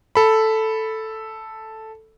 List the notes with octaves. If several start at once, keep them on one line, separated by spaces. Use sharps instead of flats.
A4 B5